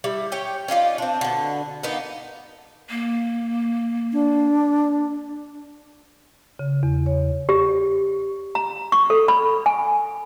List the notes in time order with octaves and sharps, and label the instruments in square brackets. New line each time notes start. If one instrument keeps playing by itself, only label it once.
[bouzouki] G3 E4
G4 C#5 G5
C#4 D#4 F4 D5
C4 D4
B2 D3
A#3 B3 D#4
[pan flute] A#3
[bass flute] D4
[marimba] C#3
E2
C#5
[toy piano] G4
A#5
C#6
A4
B5
G#5